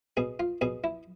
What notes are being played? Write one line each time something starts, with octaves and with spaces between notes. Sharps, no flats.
B2 G#4
F4
B2 G#4
E4